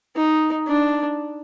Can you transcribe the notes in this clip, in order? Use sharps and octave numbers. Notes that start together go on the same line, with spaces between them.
D#4
D4